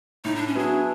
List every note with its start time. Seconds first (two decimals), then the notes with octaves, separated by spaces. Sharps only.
0.25 A2 D#4
0.36 D4
0.48 C#4
0.55 F#3 B3 D4 E4 G#4